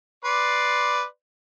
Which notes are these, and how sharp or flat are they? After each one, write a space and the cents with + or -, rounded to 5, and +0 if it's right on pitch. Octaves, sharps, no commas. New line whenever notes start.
B4 +0 D5 +0 C6 +0